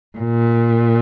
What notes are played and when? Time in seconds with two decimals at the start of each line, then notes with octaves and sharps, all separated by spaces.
0.18 A#2